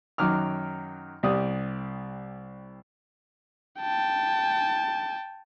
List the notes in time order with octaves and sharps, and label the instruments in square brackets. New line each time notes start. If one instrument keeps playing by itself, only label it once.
[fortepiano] F#2 D#3 F#3 D6 F6
C2 G4 D5 D#6
[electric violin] G5 A5